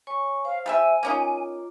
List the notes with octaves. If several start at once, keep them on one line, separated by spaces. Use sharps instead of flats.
C#5 G#5 C#6
C5 F5
G3 B4 E5 G#5
A#3 C#4 D#4 F4 D6